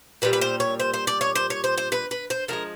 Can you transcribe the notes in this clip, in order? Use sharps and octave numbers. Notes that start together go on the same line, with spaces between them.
A#2 G3 B4
B4
C5
C#5
C5
C5
D5
C#5
C5
C#5
C5
C5
B4
B4
C5
D3 F3 G#3 A#4